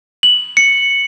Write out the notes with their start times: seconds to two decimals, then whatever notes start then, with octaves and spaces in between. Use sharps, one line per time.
0.23 F#7
0.57 C#7